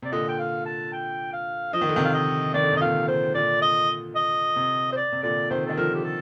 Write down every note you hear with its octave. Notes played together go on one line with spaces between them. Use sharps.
C3 D5
A#2 D3 D#5
G5
F5
A5
G5
F5
F3 D#5
D#3
D3
C3 D#3
F5
D#5
D#3 D5
D3
C3
D#5
A#2 D3 F5
C5
A#2 D3 D5
D#5
D#5
C3
C5
D5
C3
A#2 D3 D5
C3 D#3 C5
D#3 A4
D3 F3 A#4
G4
A4